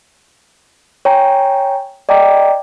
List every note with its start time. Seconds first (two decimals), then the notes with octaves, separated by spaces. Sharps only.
1.05 C#5 G5 G#5 A#5
2.09 D5 D#5 G5 A#5 D6